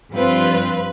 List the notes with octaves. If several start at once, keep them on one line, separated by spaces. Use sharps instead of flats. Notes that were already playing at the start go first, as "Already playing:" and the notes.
G2 F3 C4 F4 B4